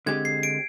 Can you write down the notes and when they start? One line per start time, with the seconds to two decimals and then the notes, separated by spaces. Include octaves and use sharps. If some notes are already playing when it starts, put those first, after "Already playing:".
0.06 D3 G#3 C4 G4 G#6
0.25 C7
0.43 D7